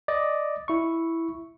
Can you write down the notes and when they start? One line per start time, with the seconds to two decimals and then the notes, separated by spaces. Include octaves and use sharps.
0.08 D5 D#5
0.68 E4 C#6